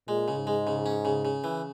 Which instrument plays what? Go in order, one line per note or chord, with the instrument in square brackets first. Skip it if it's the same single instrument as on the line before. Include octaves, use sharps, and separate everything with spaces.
[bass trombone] A#2 [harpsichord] G#3
[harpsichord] C#3
[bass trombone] G#2
[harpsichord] G#3
C#3
C#4
C#3
C#3
E3